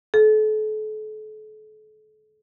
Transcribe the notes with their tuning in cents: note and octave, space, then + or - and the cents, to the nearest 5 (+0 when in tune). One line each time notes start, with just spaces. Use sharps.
A4 -35